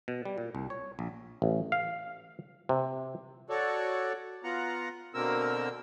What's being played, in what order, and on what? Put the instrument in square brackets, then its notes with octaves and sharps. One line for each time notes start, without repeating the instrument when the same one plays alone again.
[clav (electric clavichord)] B2
G3
A#2
C2
C#5
A#1
A1
F5
C3
[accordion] F#4 A4 C#5 D5
B3 F4 F#5 A#5
B2 D3 A#3 C4 A#4 E6